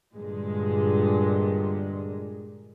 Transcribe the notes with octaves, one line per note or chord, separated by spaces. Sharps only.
G2 A#2 D3 G#3